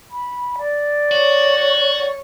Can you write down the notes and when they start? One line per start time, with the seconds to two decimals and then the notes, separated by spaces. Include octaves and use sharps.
0.11 B5
0.58 D5
1.11 F#4 C#5